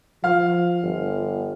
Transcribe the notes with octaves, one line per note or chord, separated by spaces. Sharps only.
F3 F5 F6
G1